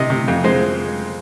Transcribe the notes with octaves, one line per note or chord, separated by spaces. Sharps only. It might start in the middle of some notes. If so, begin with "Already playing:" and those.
Already playing: C3 D#5
C3
F2
G#3 C5